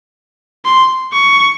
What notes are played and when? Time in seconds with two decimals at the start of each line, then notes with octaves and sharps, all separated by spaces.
0.65 C6
1.14 C#6